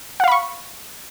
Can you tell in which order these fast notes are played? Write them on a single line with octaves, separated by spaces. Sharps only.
F#5 F5 B5 C#6